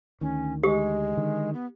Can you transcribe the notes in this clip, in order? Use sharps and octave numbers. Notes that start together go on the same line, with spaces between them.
D2 D#3 C#4
G#3 G4
D3 D#3
B3